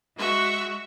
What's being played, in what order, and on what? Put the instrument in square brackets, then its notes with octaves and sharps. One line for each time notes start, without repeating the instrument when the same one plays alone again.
[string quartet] G#3 F#4 E5 C#6